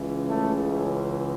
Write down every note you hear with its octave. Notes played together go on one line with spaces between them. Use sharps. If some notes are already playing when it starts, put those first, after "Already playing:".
Already playing: C#2 C#3 E3
A3